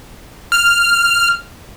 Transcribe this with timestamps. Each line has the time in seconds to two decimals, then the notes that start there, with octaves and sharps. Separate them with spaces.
0.52 F6